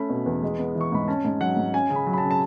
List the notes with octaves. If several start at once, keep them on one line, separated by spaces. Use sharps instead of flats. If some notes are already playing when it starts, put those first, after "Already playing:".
Already playing: A3 C#4 B5
B2
E2
G#3
B3
E3
C#6
G#2 B5
C#4 A5
G#2
F#3 F#5
G#2
C#4 G#5
C#3
B5
F#3
B5
A5
C#3
A5